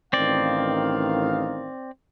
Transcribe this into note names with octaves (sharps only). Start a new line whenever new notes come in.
A1 D#3 C4 D5 F5